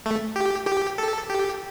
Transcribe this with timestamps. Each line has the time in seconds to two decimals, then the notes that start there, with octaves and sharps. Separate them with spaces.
0.06 A3
0.36 G4
0.67 G4
0.98 A4
1.30 G4